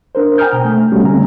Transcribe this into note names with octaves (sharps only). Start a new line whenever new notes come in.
D4 A#4 C5
G5 G#5 A#5 D#6 F6 G6
B2
A3
G3 A3 C#4 F#4 G4
D3 G3 G#3 C4 G#5 A#5